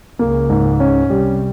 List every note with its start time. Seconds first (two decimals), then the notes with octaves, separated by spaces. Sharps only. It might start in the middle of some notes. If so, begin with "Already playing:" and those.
0.19 C#2 C#3 A#3
0.49 G#2
0.80 C#4
1.10 C2 C3 G3